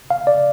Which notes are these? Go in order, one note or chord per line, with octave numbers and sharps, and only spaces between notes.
F5
D5